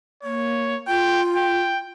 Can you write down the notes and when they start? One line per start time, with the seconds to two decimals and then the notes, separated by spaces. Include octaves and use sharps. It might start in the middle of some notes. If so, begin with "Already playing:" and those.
0.24 A#3 C#5
0.88 F4 G5
1.36 G5